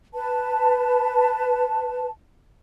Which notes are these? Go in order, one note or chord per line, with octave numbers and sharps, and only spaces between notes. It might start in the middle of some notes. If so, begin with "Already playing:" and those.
B4 A5